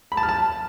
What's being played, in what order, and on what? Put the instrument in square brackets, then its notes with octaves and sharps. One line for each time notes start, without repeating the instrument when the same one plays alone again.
[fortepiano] B5
A5
F6
A5